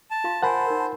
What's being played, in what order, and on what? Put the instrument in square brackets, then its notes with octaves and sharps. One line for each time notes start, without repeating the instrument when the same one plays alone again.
[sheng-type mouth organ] A5
[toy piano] F4 F5 C6
[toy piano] A#4 G#5 [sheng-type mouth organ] C5 [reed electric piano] F#5 A5 B5
[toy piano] D#4 A#4